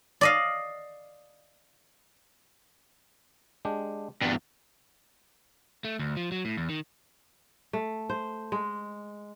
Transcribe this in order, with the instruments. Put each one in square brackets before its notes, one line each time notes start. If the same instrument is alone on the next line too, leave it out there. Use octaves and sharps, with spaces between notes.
[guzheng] D5 D#5 F5
[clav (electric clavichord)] G#3 D4 G4
[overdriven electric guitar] E2 G2 [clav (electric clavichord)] G3
[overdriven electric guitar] A3
D2
F3
F#3
A2
E2
D#3
[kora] A3
C5
G#3